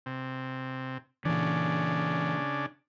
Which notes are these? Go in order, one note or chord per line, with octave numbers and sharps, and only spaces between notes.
C3
A#2 C#3 E3 D4